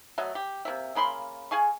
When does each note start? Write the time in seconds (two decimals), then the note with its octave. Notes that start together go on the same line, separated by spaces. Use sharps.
0.18 F#3 A3 D#5 E5
0.35 G4
0.65 C3 A#3 E5
0.95 C#3 A#3 B5 C6
1.51 G#4 F5 G#5 C#6